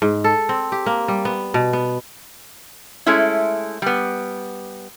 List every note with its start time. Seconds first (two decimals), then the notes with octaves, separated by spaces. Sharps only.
0.02 G#2
0.24 A4
0.49 C4
0.72 G4
0.86 A#3
1.08 G3
1.25 B3
1.54 B2
1.73 B3
3.06 G#3 A3 C#4 E4
3.82 G3 B3